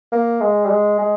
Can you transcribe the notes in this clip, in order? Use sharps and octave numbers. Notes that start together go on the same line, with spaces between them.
A#3
G#3
G3
G#3
G#3